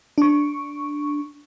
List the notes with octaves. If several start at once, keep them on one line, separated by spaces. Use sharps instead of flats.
D4 C#6